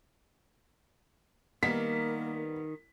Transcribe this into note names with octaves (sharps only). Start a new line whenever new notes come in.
D#3 G3 A#3 B3 B6